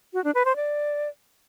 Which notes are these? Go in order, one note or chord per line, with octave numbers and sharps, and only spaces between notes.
F#4
D4
B4
C5
D5